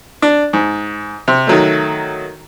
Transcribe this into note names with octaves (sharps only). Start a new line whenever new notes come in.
D4
G#2
C3
D#3 F#3 A3